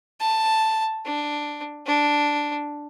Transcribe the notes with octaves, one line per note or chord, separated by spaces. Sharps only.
A5
D4
D4